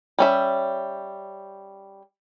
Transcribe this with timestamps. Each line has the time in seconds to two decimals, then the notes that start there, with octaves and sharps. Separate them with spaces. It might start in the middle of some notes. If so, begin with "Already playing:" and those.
0.19 G3 C#4 E5